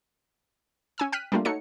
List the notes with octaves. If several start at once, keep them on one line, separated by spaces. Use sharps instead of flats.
C#4 G#5 E6
G5 F6 F#6 B6 D#7
G3 A3 A#3 D4 F4
A3 D#4 F#4 C#5 C#7